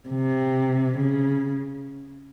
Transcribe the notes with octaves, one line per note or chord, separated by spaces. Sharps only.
C3
C#3